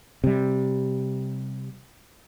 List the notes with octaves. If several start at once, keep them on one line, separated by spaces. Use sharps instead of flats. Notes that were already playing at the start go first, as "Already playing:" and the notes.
C3 G3